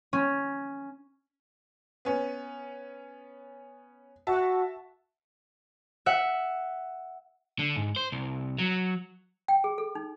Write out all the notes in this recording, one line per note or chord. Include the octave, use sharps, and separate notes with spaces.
C#4
B3 C#4
F#4 E5 A5
E5 F#5
D3
G#2
C5
C2
F#3
G5
G#4
A4
D#4